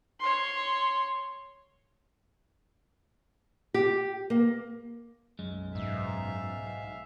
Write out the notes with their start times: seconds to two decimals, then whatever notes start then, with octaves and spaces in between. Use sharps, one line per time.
0.19 C#5 C6
3.74 G4
4.30 A#3
5.39 B1 F#2 G#3
5.75 G#2 E5 F5